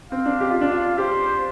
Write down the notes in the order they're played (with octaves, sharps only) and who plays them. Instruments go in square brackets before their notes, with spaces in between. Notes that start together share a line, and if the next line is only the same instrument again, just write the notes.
[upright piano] C4 [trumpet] F5
[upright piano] D4
G4
F4
D4
F4
[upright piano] G4 [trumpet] C5